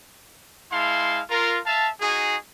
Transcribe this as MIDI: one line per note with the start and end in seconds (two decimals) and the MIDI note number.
0.72 1.20 56
0.72 1.20 64
0.72 1.20 77
0.72 1.20 81
0.72 1.20 84
1.30 1.58 65
1.30 1.58 70
1.66 1.88 76
1.66 1.88 77
1.66 1.88 81
2.00 2.36 63
2.00 2.36 66
2.00 2.36 68